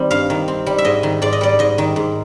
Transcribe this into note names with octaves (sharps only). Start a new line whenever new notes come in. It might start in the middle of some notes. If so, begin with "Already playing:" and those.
Already playing: D#3 G3 C4
G2 F5
D#3
C4
G3
E5
G#2 D#5
D#3
G#2 D5
D#5
G3 D5
G#2 D#5
D#3
G#2